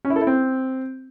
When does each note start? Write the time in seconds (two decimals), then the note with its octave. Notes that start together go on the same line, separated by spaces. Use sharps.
0.05 C#4
0.10 E4
0.16 A4
0.21 E4
0.27 C4